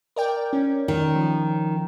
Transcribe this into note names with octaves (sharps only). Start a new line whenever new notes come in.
A#4 D5 G5
C#4
D#3
F3